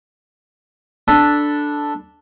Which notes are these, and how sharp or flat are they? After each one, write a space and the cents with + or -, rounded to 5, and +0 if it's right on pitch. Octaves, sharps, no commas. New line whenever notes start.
D4 +0 A4 +0 B5 -5